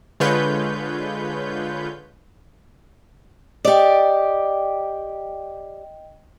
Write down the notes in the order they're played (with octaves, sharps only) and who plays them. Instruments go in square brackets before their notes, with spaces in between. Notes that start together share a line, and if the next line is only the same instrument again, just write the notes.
[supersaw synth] D3 G#3 F4 B4 C#5 G6
[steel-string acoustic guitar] G4 D5 [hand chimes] D#5 G5